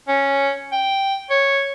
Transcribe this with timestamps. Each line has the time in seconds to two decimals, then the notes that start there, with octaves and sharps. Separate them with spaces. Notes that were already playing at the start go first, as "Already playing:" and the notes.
0.08 C#4
0.72 G5
1.30 C#5